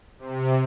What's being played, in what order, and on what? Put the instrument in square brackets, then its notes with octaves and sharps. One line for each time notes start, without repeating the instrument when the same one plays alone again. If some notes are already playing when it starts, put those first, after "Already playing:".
[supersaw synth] C3